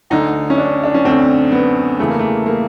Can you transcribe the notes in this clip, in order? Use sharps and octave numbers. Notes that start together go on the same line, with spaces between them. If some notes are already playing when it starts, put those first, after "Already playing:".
D2 D3 D#4
C#4
D4
D4
C#4
D2 D3 C4
B3
E2 C#3 E3 A3
A#3
A3
A#3